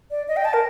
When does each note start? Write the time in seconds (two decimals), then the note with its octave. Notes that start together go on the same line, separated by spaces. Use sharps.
0.11 D5
0.28 D#5
0.37 G5
0.45 A5
0.53 A#4